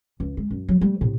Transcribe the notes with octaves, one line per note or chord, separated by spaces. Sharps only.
C#2
G#3
F#2
F#3
G3 A3
A2 C3